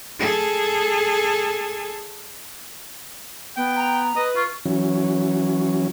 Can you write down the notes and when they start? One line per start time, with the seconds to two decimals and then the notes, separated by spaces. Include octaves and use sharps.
0.19 G#4 A4
3.57 B3 G5
3.76 A#5
4.16 B4 D#5
4.36 F4 C#6
4.66 E3 F#3 C#4